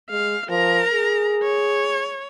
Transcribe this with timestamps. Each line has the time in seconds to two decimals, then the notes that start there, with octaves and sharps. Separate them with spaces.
0.10 G#3 F5
0.49 F3 A#4 A#5
0.93 G#4
1.43 C#5